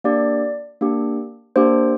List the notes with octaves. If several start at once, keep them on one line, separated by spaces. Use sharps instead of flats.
A#3 D4 G4 D5
A#3 D4 G4
A#3 D4 G4 C5